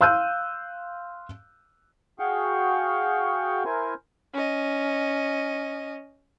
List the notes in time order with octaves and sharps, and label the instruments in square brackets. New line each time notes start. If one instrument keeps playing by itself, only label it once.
[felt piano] F5 C6 E6 F#6 G6 D#7
[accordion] F#4 G#4 F5 G5 C#6
E4 A#4 C5 G#5
[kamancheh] C#4 D#5